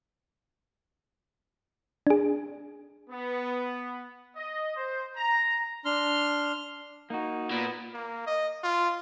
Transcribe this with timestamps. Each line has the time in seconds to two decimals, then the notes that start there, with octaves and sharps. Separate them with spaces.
2.07 D4 G#4
3.10 B3
4.36 D#5
4.76 C5
5.16 A#5
5.85 D4 C6 F6
7.10 A#3 D#4 F#4
7.51 A#2 B3
7.94 A#3
8.26 D#5
8.63 F4